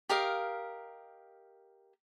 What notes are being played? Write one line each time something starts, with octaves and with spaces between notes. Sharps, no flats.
G4 A#4 D#5 F5